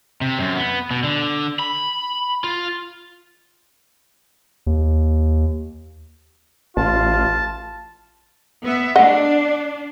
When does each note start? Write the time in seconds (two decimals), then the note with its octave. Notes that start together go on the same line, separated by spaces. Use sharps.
0.21 C3
0.39 F#2
0.57 B3
0.91 B2
1.04 D3
1.59 B5
2.44 F4
4.67 D#2
6.77 A1 F4 A5
8.63 B3 E5
8.96 D4 D#5 F#5